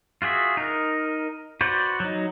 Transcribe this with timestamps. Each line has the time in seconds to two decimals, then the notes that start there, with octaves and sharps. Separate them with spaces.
0.22 F4 F#4 G#4 E5
0.57 D#4 A#4
1.61 F#4 B4 C5 D5
2.00 F#3 D#4